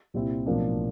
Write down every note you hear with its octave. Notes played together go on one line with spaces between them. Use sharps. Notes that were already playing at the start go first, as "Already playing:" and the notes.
C2 A#2 G3 C4 E4
B1 A2 F3 A#3 D4